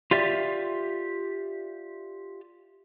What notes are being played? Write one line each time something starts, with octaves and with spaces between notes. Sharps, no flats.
F4 G4 D5 E5